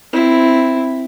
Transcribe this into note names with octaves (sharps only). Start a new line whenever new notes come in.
C4 E4